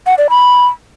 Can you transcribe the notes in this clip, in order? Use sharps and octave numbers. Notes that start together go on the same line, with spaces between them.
F#5
D5
B5